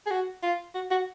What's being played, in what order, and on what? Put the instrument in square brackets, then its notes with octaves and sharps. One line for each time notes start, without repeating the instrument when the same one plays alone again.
[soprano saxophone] G#4
F#4
F4
F#4
F#4